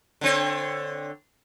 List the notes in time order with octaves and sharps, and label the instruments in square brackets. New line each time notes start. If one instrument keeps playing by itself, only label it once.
[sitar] D3 C4 C#5